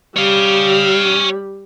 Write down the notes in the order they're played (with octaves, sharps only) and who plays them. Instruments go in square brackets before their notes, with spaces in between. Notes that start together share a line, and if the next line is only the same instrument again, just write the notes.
[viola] G3 [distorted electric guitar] C#5 F5